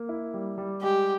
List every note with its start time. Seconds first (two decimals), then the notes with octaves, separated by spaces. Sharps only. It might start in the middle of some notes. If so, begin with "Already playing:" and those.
Already playing: A#3
0.09 E4
0.34 G3
0.58 G3
0.82 G#3 G4